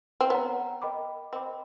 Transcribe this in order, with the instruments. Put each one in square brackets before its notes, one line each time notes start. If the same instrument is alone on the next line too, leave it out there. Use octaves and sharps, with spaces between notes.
[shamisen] C4
[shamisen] B3 [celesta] C#5 F#5 A#5
[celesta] A#4 D#5 G5 B5 D6
[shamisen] C4 [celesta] A#4 D#5 G5 B5 D6